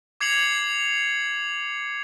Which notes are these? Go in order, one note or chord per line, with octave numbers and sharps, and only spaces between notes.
D6 G#6 C7 C#7 F7 F#7